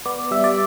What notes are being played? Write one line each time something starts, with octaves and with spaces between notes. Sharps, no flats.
B3 D5
G3 E5
D5